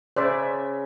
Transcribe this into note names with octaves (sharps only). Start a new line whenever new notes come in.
C#3 C5 D5 E5